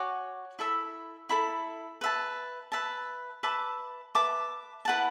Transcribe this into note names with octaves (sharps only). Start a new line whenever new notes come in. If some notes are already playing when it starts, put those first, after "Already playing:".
Already playing: F#4 C#5 G#5 D6
E4 A4 E5 B5
E4 A4 E5 B5
B4 E5 A5
B4 E5 A5
B4 E5 A5 D6
B4 E5 A5 D6
E4 B4 F#5 A5